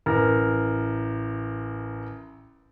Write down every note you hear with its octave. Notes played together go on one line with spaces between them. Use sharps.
A1 A#4